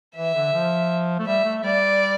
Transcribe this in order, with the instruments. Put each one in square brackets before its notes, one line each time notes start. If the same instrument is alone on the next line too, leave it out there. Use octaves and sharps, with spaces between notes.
[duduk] E3 [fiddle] E5
[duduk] D3
F3
A3
[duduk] G3 [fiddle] E5
[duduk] A3
[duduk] G3 [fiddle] D5